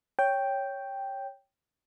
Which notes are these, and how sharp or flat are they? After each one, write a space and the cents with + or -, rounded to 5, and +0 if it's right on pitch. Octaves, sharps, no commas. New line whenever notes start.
C#5 +0 G5 +0